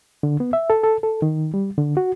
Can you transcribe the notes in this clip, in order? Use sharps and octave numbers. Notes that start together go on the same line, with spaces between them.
D3
B3
E5
A4
A4
A4
D#3
G3
D3
F#4